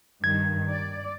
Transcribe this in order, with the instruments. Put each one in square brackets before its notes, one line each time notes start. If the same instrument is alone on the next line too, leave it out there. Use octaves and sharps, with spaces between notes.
[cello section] G2 D#3 [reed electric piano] G#6
[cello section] D5